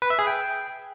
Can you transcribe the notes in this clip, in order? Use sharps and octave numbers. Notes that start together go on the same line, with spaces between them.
B4
E5
G#4
G5